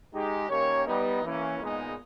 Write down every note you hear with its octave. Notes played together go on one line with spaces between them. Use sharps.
G#3 D#4 G4
D#3 A#3 C#4 G4 C#5
G3 B3 D#4
E3 A#3 C#4
A#2 G#3 B3 D#4